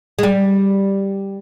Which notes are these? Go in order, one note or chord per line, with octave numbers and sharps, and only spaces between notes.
G#3
G3